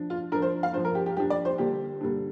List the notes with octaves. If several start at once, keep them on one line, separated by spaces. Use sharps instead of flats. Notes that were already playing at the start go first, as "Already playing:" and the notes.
Already playing: F3 D4
F4
F3 D4 A#4
C5
F5
F3 D4 C5
A#4
G4
G4
F3 D4 G4
D5
C5
D3 G3 A#3 D4 G4
D3 G3 A#3 D4